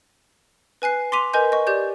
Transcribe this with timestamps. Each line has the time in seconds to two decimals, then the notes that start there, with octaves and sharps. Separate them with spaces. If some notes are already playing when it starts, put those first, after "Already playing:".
0.82 B4 G#5 F#6 C7
1.12 C6 D6 B6 D#7 F7
1.34 A#4 B4 D#5 G#5 G6
1.52 D#5 C#6
1.67 G4 D5 G6